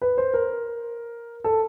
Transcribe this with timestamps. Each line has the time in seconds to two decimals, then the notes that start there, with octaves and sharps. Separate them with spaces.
0.02 B4
0.18 C5
0.34 A#4
1.44 A4